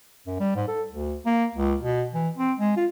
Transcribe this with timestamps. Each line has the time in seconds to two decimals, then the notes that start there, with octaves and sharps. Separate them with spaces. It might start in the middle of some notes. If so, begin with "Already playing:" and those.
0.27 F#2
0.40 G3
0.55 G#2
0.68 A4
0.91 D2
1.25 A#3
1.55 C#2
1.81 B2
2.14 E3
2.37 C4
2.58 G#3
2.76 F4